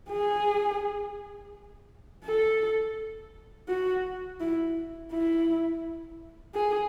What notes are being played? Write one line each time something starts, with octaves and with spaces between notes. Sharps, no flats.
G#4
A4
F#4
E4
E4
G#4